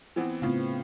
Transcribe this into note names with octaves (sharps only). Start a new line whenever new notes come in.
E3 B3 C4
A2 C#3 B3 C4 F4